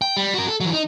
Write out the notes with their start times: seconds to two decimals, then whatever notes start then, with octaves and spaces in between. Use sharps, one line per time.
0.02 G5
0.17 G3
0.34 F#4 A#4
0.48 A4
0.60 E3 F#3
0.73 D#4